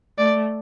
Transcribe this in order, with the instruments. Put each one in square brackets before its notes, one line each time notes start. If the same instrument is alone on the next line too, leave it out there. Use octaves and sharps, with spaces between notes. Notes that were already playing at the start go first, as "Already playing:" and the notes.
[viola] A3 [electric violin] D5